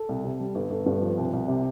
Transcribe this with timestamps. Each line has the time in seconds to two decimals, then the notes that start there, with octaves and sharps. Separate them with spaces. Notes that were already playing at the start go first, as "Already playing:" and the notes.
Already playing: A4
0.09 C2
0.24 C3
0.40 G3
0.55 G1
0.70 G1
0.86 G2
1.02 F3
1.17 C2
1.33 C2
1.48 C3